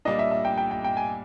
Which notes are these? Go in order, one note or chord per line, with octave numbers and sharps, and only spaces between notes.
A#2 G3 A#3 D4 D#5
E5
E5
G5
G5
G5
G5
G#5